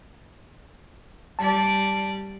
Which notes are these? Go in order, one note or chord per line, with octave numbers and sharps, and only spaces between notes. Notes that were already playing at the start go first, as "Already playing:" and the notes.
G3 D5 A5